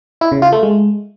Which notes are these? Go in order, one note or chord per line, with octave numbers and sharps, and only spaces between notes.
E4
C#3
F4
A3
G#3